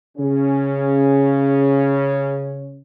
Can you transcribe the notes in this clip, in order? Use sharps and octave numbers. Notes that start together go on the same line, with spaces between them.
C#3 C#4